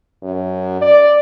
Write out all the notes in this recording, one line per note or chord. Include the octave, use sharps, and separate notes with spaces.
F#2
D5